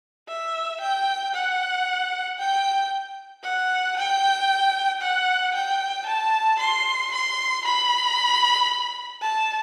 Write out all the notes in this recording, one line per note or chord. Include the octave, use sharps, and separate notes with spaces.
E5
G5
F#5
G5
F#5
G5
F#5
G5
A5
C6
C6
B5
A5